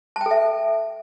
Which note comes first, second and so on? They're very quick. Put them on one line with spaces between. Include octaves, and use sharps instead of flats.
A5 G5 A4 E5